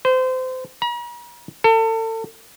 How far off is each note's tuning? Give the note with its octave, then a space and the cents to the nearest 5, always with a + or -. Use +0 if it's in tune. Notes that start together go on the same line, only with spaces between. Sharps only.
C5 -30
A#5 +45
A4 +35